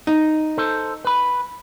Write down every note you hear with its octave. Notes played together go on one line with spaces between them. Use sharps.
D#4
A4 C5
B4 B5